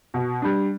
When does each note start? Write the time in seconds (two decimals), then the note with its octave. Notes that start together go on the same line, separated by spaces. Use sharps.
0.14 B2
0.42 G3 D4